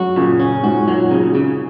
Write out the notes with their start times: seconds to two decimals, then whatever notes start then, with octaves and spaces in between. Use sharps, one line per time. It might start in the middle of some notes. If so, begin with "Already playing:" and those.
Already playing: F#3 G#3 F#4
0.16 A#2 C#3
0.40 A#2 C#4
0.63 G#2 F#4
0.78 G#2
0.88 A#2 F#3
1.11 C#3
1.35 C#3